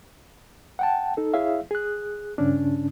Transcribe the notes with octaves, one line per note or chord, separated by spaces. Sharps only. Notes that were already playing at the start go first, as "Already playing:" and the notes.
F#5 G5 A5
D#4 A4
E4 G#4 C#5 E5 F5
G#4 F#6
G2 C#3 C#4 D4